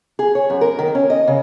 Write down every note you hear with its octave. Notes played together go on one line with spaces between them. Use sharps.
G#4
C#5
F#2
A#4
D#3
C#4
D#5
C#3